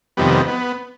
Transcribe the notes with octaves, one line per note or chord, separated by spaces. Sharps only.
F2 C3 D#3 G3 B3
B3